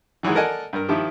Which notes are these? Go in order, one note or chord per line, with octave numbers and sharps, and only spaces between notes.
D#3 E3 F#3 G#3
A4 A#4 D5 D#5 F#5 G#5
G2 A#4
D#3 F3 E4 G4